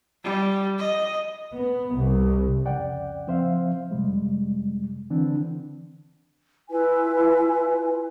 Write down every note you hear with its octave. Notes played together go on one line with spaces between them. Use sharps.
G3
D#5
B3
C2
F2 C#3 D5 F#5 G5
F3 C4 C5 E5 F5
F2 C3 G3 G#3
D3 E3 C4 D4
E4 F4 B4 G#5